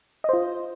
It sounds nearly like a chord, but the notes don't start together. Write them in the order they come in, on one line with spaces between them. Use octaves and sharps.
D#5 C5 F4